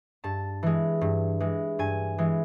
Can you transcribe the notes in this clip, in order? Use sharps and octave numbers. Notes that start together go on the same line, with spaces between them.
G2 A5
E3 G#3
G2
E3 G#3
G2 G#5
E3 G#3